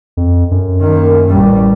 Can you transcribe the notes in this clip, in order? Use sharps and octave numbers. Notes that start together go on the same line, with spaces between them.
F2
F#2
D#3 A#3
A1 G3